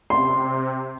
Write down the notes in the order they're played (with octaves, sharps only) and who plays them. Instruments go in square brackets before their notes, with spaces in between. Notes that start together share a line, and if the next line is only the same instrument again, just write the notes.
[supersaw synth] C3 [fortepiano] C6